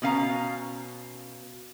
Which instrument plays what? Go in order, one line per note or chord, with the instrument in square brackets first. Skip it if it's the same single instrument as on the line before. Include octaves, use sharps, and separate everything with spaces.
[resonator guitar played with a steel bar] B2 C#4 F5 A#5